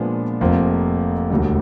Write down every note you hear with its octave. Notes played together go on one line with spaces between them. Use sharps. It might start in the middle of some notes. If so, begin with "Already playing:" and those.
Already playing: A#2 F3 G#3 B3 D4
F1 F2 C3 F3 A#3
E1 D2 D3 G3